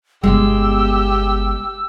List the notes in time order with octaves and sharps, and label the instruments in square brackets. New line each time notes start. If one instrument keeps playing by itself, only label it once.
[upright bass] G1 B2 [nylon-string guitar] G#3 [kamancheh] G4 [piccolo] E6